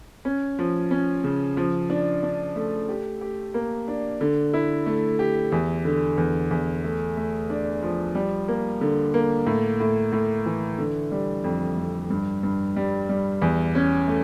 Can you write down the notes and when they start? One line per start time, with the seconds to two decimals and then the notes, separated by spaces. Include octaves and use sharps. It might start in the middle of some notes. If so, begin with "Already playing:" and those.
0.25 C#4
0.59 F3
0.91 C#4
1.24 C#3
1.57 F3
1.90 D4
2.23 D4
2.56 A3
2.89 G4
3.21 G4
3.54 A#3
3.88 D4
4.21 D3
4.54 E4
4.86 A3
5.19 G4
5.52 E2
5.85 D3
6.18 E2
6.51 E2
6.84 A3
7.17 A3
7.50 D4
7.83 F3
8.15 G3
8.48 A#3
8.81 D3
9.14 A#3
9.47 A2
9.80 A2
10.13 A2
10.46 E3
10.79 D3
11.12 G3
11.44 F2
11.78 F2
12.10 G2
12.43 G2
12.76 G3
13.09 G3
13.42 E2
13.75 C#4
14.08 A3